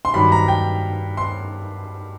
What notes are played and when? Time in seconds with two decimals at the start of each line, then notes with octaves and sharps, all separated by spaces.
0.05 C6
0.14 G2 D#3 F#3 B5
0.32 A#5
0.48 G5
1.17 C6